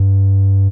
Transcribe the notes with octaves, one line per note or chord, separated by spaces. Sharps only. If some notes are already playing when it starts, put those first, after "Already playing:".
Already playing: G2